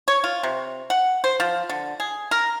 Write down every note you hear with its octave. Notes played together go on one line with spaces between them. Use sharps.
C#5
F4
C3
F#5
C5
F3
D3
G#4
A#4